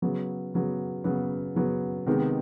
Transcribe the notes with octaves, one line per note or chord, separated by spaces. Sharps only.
C#3 F#3 B3
C#3 F#3 B3
C#3 F#3 B3
C#3 F#3 B3
C3 D#3 G#3 B3